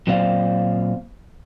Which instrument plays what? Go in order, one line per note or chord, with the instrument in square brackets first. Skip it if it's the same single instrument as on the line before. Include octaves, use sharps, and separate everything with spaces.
[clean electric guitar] A#2 F#3 C4 C5 D5 F5